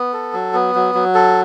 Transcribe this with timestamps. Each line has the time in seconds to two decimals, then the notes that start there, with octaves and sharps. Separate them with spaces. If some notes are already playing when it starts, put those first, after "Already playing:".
Already playing: B3
0.13 A4
0.33 F#3
0.54 B3
0.75 F#3
0.95 F#3
1.15 A4